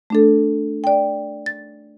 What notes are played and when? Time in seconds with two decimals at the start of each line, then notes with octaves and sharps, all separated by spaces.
0.10 A3 D4 A4
0.84 D5 G5
1.46 A6